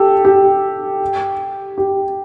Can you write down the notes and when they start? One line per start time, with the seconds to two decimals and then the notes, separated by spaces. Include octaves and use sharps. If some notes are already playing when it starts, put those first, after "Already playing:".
Already playing: G4 A4
0.25 G4
1.78 G4